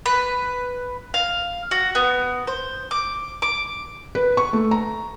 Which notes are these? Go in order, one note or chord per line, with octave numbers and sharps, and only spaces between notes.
B4
F5
F#4
B3
C5
D6
D6
B4
C#6
A3
A#5